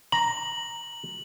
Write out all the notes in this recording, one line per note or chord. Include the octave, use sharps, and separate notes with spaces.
A#5 F#7